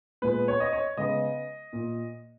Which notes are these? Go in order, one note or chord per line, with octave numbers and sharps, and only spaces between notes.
A#2 G#3 B3 B4
C#5
D#5
C#5
C#3 G#3 B3 D#5
A#2